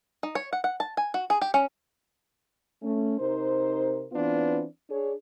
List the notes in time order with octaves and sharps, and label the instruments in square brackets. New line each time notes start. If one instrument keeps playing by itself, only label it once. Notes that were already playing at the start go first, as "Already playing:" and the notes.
[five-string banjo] D#4
C#5
F#5
F#5
A5
G#5
F#4
G#4
G4
C#4
[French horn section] A3 C#4
C3 D#4 A#4 C5
E3 B3 C4 D4 F4 B4
D4 G#4 C#5